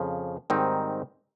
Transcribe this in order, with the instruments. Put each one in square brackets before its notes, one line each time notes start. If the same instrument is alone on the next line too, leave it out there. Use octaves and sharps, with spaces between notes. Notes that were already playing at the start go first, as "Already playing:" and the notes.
Already playing: [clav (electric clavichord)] F2 C#3 F3
G#2 D#3 G3 C4 D#4